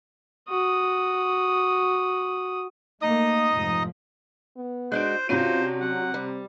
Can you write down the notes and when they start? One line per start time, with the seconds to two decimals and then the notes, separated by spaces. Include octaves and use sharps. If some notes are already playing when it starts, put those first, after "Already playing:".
0.49 F#4 D#6
3.02 A3 A#3 D#4 D#5 D#6
3.53 F1 G#2 F3
4.57 B3
4.92 G#3 D4 F#4 C5 F#6 G6 D7
5.29 C3 C#4 D4 F4 F#4 C5 D#7
5.81 F#3 F#5
6.14 G3 C4